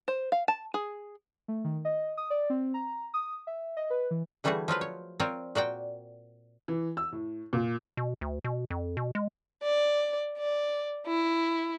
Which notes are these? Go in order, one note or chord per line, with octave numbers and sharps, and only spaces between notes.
C5
F5
A5
G#4
A3
D#3
D#5
D#6
D5
C4
A#5
D#6
E5
D#5
B4
E3
D3 E3 G3 A3 F#4 G#4
F3 F#3 F4 B4
C#5
C4 F4 A#4 C#5 D5
A#2 F#4 D5 G5
E3
E6
A2
A#2
B2
D2
B2
F2
B2
G#3
D5
D5
E4